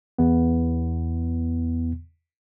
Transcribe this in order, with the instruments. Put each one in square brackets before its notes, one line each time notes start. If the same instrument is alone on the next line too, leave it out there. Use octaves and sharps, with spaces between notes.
[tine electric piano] E2 B3